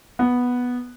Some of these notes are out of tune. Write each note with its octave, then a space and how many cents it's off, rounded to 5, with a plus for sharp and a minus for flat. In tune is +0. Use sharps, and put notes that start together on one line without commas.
B3 -5